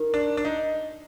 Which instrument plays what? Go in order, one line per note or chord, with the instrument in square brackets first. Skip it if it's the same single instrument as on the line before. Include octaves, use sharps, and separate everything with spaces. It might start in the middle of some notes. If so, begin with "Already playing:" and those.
Already playing: [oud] D#3
[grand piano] D4
D4
D#4